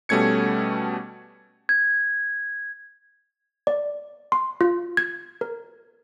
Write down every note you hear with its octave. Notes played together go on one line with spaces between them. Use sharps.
B2 G3 A3 C#4 G#6 C#7
G#6
D5
C6
F4
G#6
A#4